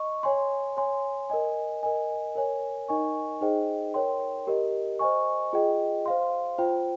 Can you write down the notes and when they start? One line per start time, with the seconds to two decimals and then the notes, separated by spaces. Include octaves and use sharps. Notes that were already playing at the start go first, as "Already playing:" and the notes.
Already playing: D#5 C#6
0.23 C#5 G#5 C6
0.77 C#5 G#5 C6
1.30 A#4 D#5 G#5
1.83 A#4 D#5 G#5
2.35 A#4 C#5 G#5
2.88 D#4 A#4 D#5 G#5 C#6
3.41 D#4 G#4 C5 D#5 G5
3.94 A#4 C#5 G5 C6
4.47 G4 A#4 D#5
4.99 C5 D#5 G#5 C#6
5.53 F4 G#4 D#5 G5
6.06 C5 F5 C6
6.58 F4 C5 G5